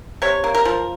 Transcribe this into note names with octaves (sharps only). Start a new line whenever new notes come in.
C3 C#5
A#3
A#4
F3